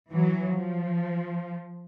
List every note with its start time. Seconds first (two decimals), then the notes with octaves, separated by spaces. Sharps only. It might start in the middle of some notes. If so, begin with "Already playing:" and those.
0.10 E3 F#3
0.54 F3